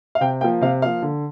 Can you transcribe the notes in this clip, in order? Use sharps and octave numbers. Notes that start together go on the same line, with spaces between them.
F5
C3 G5
F3 A#3 G5
C3 F5
F3 A#3 F5
D3